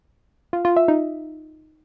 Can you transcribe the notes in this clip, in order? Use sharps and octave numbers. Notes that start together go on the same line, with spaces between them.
F4
F4
E5
D#4